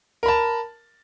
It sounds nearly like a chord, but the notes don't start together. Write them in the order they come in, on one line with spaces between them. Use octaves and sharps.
A#4 B5 A5